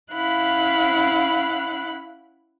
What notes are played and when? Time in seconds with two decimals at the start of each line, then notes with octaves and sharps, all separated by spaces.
0.12 C#4 E4 F5 F#5 B5 F#6